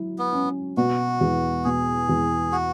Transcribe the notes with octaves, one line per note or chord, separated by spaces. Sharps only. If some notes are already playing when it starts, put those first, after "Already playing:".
Already playing: F#3 E4
B3
C#4
B2 F#4
E2
B2 G#4
E2
F#4